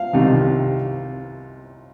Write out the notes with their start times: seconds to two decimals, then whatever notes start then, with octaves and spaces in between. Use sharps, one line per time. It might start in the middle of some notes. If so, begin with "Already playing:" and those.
Already playing: F5
0.13 C2 C3 D#3